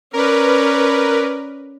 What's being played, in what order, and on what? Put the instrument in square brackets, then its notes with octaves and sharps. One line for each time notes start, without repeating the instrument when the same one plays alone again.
[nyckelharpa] C#4 D5 [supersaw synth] A#4 B4